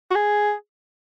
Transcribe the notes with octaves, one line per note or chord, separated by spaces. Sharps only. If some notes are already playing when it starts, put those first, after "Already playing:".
F#4
G#4